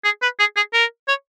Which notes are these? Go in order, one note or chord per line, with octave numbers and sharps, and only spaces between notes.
G#4
B4
G#4
G#4
A#4
C#5